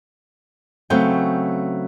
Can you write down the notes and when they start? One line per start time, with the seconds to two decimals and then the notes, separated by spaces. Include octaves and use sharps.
0.90 C#3 F#3 A3 B3 C4 G5